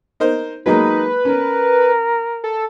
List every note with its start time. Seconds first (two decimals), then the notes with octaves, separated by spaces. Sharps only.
0.20 D#4 A#4 C5
0.66 F#3 G#3 A#3 D#4 B4
1.25 C#4 A#4
2.44 A4